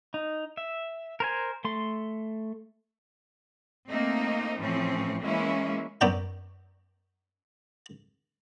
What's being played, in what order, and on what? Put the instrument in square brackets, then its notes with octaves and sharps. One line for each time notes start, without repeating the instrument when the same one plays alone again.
[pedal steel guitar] D#4
E5
A#4 C5 G#5
A3 C6
[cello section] A3 A#3 C4 D#4
A2 E3 F3 C4 C#4
E3 G#3 A#3 C#4 E4
[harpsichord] F#2 B3 C#4 D5 G5 A#5